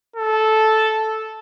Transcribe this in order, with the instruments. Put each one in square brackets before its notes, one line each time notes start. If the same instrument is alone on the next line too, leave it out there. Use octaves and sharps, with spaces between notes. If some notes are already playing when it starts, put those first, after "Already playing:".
[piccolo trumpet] A4